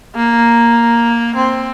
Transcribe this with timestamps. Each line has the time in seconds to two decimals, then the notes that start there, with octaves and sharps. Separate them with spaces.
0.16 A#3
1.36 C4